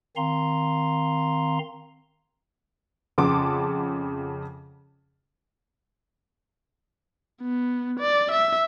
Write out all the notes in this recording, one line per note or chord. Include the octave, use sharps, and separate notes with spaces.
D#3 C4 F5 A#5 C6
F2 C#3 F#5 A5 C6 D6
B3
D5
E5